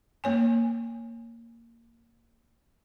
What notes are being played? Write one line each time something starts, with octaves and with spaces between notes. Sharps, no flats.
A#3 C#5 G#5